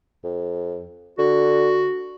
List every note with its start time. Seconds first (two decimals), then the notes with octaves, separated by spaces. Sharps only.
0.24 F2
1.18 D3 F#4